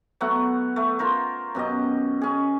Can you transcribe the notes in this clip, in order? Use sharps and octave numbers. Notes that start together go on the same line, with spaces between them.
F#3 A3 B3 F#5
A3
F4 A#4 C5
F#2 B2 G4 D#5
C#4 G#4